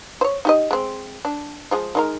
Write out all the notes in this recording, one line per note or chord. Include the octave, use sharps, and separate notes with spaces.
C5 C#5
D#4 G4 D#5
G#3 C4
D4
F3 G#3 G#4
D#3 G#3 A#4